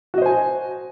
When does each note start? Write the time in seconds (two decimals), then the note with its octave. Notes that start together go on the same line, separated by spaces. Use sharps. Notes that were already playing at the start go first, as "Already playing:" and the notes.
0.14 F#4
0.18 D#5
0.22 C5
0.26 G#5